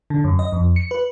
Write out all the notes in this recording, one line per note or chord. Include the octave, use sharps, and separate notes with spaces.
D3
F#2
D#5
F2
C#7
B4